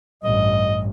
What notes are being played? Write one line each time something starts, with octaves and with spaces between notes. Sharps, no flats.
A1 G2 D#5